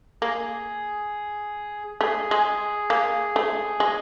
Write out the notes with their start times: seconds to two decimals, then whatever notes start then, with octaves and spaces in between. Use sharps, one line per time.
0.22 A#3 G#4
2.01 A3 G#4
2.31 G#3
2.90 A#3
3.36 A3
3.80 G#3